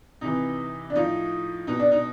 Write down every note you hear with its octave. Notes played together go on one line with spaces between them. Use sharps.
C3 E3 D#4
D4
A2 F3 D#4
B2 D#4
D4
D#4